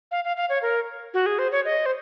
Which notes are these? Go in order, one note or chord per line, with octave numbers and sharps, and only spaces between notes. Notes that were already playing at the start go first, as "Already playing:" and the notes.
F5
F5
F5
C#5
A#4
F#4
G#4
C5
C#5
D#5
C5